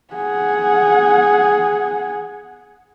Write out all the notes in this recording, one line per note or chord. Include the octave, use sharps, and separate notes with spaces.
G#4 F#5